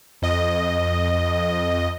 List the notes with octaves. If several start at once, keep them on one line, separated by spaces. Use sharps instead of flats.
F2 D#5